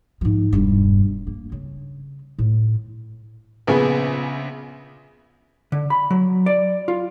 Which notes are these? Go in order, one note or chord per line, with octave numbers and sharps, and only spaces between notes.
G#2 F3
E1 G2
A#3
C#3
A2
A#1 C#3 B3 G#4
D3
B5
F#3
D5
F4